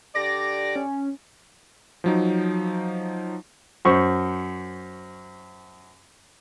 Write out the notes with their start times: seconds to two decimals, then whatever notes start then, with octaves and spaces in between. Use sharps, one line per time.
0.16 D3 G4 D5 A#6
0.76 C#4
2.04 F3 F#3 D#4
3.85 F#2 C5 C#6